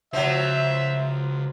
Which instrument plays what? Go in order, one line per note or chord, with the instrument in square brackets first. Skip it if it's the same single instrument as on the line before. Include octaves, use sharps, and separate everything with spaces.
[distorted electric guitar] C#2 [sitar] F3 F#3 [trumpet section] C5 E5